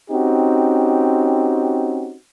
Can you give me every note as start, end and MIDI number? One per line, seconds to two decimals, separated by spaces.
0.10 2.15 60
0.10 2.15 61
0.10 2.15 63
0.10 2.15 66
0.10 2.15 67